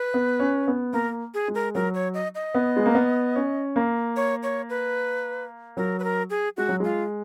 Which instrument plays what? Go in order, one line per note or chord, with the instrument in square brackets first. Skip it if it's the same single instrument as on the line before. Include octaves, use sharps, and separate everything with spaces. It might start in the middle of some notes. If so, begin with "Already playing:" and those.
Already playing: [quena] B4
[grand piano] B3
C#4
B3
[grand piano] A#3 [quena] A#4
[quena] G#4
[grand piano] G#3
[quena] A#4
[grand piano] F#3 [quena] A#4
[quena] C#5
D#5
D#5
[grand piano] B3
G#3
A#3
B3
C#4
A#3
[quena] C#5
C#5
B4
[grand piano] F#3 [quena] A#4
[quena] B4
A#4
G#4
[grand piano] G#3 [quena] F#4
[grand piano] F#3
[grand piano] G#3 [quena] F4